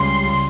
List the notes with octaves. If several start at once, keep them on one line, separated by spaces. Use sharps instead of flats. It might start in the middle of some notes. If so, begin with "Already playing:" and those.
Already playing: C#2 C#3 G3 C6